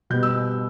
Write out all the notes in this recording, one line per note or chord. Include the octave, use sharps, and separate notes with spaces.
B2 G3 B3 G6
E6